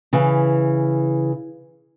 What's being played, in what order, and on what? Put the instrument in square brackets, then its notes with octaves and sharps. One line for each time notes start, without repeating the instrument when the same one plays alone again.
[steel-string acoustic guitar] C#3 E3